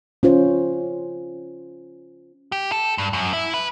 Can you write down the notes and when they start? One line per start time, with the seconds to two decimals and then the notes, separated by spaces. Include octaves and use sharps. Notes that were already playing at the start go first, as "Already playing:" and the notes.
0.23 C#4 F4 C5
2.52 G4
2.72 A4
2.98 G2
3.13 F#2
3.33 E4
3.54 B4